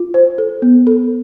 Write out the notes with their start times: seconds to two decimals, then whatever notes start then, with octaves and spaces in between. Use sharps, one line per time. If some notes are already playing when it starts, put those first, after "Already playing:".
Already playing: F4
0.14 C5
0.38 A4
0.62 B3
0.87 A4